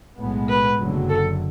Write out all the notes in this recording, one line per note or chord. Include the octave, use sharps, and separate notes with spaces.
B1 A2 G#3 B3
B4
F#1 F#2 D3 F#3
A4